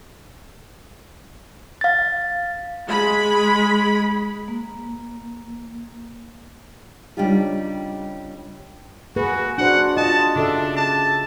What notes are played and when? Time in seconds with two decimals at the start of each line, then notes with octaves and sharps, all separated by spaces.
1.81 F5 A6
2.88 G#3 B5
4.48 A#3
7.17 C#3 G3 D4 D#4 F4 G4
9.16 A#3 F#4 G#4 B4
9.58 D4 F#4 C5 F#5
9.96 F4 D#5 A5
10.36 C#3 D4 A4 E5
10.76 A5